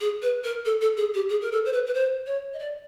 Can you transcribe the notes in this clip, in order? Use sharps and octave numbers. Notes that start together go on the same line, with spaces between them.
G#4
B4
A#4
A4
A4
G#4
G4
G#4
A#4
A4
C5
B4
B4
C5
C#5
D#5
D5